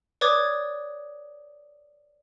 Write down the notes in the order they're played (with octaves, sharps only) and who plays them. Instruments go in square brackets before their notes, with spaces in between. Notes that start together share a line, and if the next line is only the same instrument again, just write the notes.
[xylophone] B4 C#5 D5 D6 D#6 G#6